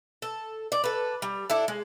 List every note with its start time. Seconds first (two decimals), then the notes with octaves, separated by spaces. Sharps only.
0.22 A4
0.72 D5
0.84 A4 B4
1.22 G3
1.50 D4 E4 A4
1.68 G#3